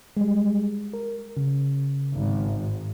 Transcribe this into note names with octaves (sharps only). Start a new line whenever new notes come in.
G3 G#3
A#4
C#3
G#1